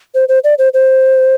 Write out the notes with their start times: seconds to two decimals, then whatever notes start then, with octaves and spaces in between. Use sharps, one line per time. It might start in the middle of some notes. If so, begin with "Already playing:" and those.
0.15 C5
0.29 C5
0.44 D5
0.58 C5
0.74 C5